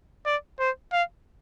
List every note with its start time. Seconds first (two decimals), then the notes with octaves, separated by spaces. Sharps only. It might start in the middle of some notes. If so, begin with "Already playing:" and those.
0.26 D5
0.60 C5
0.92 F5